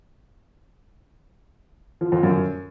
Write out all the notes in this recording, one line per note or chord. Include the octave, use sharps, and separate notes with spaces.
F3
F2
F#2